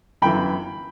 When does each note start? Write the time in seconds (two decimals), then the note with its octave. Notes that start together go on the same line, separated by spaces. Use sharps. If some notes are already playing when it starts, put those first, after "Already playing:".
0.22 G1 F#2 E3 G5 B5